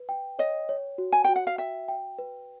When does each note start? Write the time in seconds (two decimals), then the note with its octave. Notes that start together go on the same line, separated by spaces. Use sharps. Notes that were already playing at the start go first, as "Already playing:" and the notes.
Already playing: B4
0.09 G5
0.39 C#5 D#5
0.69 C#5
0.98 F#4
1.12 G#5
1.24 F#4 G5
1.36 F#5
1.47 F5
1.58 E5 G5
1.88 G5
2.19 B4